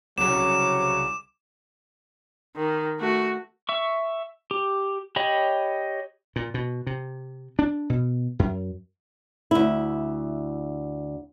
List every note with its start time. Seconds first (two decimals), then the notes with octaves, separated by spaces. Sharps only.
0.18 C2 C#3 F#3 D6 E7
2.56 D#3
2.99 A3 F#4
3.69 E5 C#6
4.51 G4
5.16 G4 C#5 D#5 B5
6.36 A#2
6.54 B2
6.87 C3
7.59 D4
7.90 B2
8.39 F#2
9.51 D2 E4